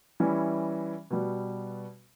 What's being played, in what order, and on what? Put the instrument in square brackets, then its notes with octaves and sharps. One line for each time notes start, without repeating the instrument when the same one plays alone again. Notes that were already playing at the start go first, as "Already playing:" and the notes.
[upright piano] E3 G3 C#4 E4
B2 G3 B3